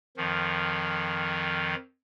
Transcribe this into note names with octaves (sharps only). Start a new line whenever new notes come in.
F2 D#3 F3